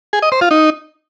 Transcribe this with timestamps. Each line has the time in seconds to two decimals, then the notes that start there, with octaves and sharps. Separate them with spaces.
0.13 G#4
0.22 D#5
0.32 C5
0.41 F4
0.51 D#4